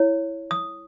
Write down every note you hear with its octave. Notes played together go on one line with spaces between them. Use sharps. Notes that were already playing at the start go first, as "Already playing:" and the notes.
Already playing: E4 C#5
D#6